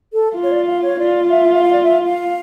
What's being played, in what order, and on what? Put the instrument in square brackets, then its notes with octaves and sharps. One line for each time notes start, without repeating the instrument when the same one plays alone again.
[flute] A4
[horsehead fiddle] F4
[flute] C#5
D5
F5
C#5
[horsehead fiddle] F4 [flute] D5
[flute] E5
E5
F5
D5
E5
F5